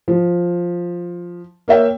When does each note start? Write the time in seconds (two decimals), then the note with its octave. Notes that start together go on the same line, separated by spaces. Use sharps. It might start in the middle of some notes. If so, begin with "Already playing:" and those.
0.08 F3
1.68 A#3 C#5 E5 G5